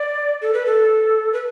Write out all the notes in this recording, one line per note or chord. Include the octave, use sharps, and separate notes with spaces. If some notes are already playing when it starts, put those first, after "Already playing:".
Already playing: D5
A4
B4
A4
B4